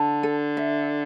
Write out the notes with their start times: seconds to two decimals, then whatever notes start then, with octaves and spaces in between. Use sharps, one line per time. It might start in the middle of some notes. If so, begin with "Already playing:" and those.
Already playing: D3 A5
0.23 A4
0.57 E5